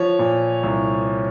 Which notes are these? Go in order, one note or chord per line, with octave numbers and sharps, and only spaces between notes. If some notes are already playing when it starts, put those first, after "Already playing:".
Already playing: F3 C#5
A#2
C2